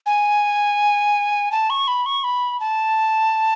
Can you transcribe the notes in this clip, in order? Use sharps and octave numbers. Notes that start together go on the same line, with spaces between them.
G#5
A5
C#6
B5
C#6
B5
A5